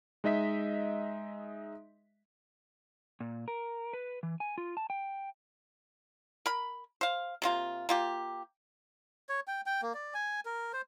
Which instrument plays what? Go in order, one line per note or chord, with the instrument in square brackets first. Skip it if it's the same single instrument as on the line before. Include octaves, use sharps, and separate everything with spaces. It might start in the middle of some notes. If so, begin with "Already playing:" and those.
[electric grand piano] G#3 D#4 D#5 E5 B6
[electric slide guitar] A#2
A#4
B4
E3
G#5
F4
A5
G5
[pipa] A#4 B5
C5 F5
C3 A#3 F4
A#3 F4 G4
[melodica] C#5
G5
G5
A#3
D5
G#5
A#4
C5